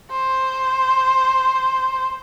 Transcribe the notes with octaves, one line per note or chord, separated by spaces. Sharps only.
C5